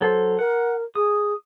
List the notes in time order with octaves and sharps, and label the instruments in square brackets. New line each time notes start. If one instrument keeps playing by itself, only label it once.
[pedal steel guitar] F#3 A4 C5
[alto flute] A#4 [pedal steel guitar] F#5
[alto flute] G#4 [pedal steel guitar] D#6